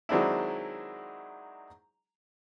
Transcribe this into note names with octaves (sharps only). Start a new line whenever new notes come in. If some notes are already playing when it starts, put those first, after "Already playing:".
D#3 F#3 G#3 C4 D4 E4